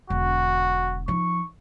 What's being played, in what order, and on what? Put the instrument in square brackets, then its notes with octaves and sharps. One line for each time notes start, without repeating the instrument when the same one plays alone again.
[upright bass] E1 D3 [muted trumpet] F#4
[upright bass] F3 D#4 [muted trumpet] C#6